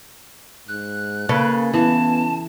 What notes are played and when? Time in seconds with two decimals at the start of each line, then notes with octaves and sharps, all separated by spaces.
0.68 G#2 F#6
1.29 C#3 A#3 A4 B4
1.74 E3 B3 A5